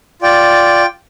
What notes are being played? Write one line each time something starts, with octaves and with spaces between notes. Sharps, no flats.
F4 D5 G5